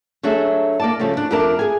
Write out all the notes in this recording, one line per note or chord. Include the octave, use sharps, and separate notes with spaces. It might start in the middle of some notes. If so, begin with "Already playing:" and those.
F#3 A3 D4 G#4 E5
A#3 D5 A5
C#3 F3 G3 A3
D4
F2 A3 D4 A#4 D5 A5
G#4 G#5